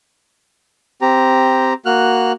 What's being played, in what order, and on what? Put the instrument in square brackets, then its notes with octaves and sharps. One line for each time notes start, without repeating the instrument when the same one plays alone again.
[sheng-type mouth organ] C4 G4 A#5
A#3 F#4 F6 F#6